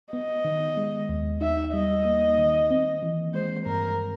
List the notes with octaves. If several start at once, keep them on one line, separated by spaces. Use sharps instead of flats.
B3 D#5
D#3
G#3
D#2
D#4 E5
G3 D#5
A#3
D#3
C4
E3
G#3 C5
G2 A#4